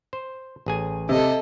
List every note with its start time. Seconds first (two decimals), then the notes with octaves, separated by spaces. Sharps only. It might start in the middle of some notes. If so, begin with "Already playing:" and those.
0.13 C5
0.66 A1 G#4 G#5
1.09 C3 A4 D#5